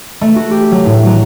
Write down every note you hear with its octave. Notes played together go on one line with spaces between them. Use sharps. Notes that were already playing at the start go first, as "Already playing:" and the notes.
A3
F#4
G4
F#3
A2
F#3